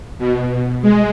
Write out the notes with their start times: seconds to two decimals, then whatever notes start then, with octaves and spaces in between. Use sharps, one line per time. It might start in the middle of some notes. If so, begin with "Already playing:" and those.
0.18 B2
0.82 G#3